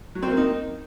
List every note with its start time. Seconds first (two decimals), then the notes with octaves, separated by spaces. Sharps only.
0.15 F#3
0.23 C4
0.30 A#3
0.37 D#4